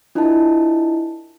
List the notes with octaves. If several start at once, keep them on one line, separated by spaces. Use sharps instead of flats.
D4 E4 F4 A#4 D#5 A5